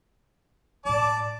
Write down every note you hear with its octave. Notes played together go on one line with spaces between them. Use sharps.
A2 G#3 D5 A5 D6